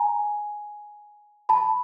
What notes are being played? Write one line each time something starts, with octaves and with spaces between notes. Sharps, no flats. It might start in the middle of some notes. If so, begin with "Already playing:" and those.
Already playing: G#5 A#5
A5 B5